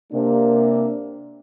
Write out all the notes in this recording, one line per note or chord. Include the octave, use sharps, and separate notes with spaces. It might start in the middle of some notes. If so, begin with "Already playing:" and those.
C3 A#3 D4